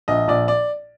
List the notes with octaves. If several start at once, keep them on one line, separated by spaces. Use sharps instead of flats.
A#1 D#5
A#1 D5
D5